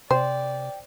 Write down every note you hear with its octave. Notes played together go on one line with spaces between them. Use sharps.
C3 C5 D5 G5